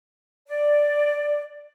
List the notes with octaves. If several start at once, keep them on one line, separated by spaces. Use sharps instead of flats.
D5